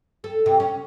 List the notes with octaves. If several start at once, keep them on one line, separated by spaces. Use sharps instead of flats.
A4
C3
C#4